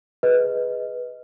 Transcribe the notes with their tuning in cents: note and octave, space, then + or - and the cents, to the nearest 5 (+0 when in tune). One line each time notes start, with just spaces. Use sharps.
G#4 +0 B4 +0 D#5 +10